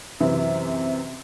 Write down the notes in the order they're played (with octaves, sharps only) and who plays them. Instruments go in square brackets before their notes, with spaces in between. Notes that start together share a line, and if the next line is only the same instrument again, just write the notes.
[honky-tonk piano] F#2 C3 E3